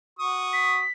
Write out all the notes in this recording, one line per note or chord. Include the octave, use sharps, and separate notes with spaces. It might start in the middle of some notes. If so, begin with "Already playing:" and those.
F#4 C#6 D#6
B6